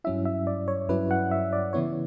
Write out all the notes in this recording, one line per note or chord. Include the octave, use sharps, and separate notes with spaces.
G2 F#3 C#4 E4 E5
E5
D5
C#5
G2 F#3 C#4 E4 B4
F#5
E5
D5
C#3 E3 B3 E4 C#5